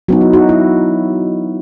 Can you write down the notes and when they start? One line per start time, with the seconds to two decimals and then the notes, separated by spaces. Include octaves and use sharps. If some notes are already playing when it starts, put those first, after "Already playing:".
0.08 F#3 B3 D#4 F#4
0.21 E4
0.33 D#4 F#4
0.49 E4